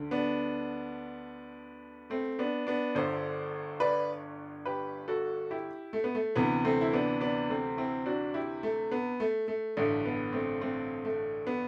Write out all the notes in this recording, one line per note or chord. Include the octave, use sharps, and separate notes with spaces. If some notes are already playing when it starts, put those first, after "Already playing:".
Already playing: D2 D3
B3 D4
A3 C4
B3 D4
B3 D4
G1 G2 D3 A4 C5
B4 D5
G4 B4
F#4 A4
E4 G4
A3
B3
A3
D2 C3 E3 B3
A3 C4
E4
B3 D4
B3 D4
A3 C4
C4 E4
D4 F#4
E4 G4
A3
B3
A3
A3
A1 G2 D3 A3
B3
A3 C4
A3 C4
A3
B3